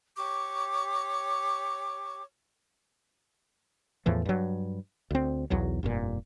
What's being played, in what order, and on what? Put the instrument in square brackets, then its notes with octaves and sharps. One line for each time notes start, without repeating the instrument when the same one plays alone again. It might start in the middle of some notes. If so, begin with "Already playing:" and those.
[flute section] G4 C#5 C#6 D6
[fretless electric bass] E2 A2 E3 F3
G2 F#3
D2 C4
B1 E2 F#3
F1 G2 A#2